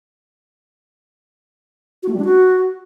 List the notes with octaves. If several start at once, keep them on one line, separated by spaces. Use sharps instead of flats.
F#4
A3
G3
D4
F#4